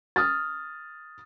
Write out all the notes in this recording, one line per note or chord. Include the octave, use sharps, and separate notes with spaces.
D#6 F6 A6